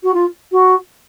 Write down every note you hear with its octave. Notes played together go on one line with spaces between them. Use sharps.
F#4
F4
F#4